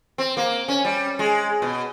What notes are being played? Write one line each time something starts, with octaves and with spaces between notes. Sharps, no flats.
C4
A#3
C#4
G3
G#3
B2